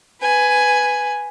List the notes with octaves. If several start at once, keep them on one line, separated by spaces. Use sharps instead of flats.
B4 G#5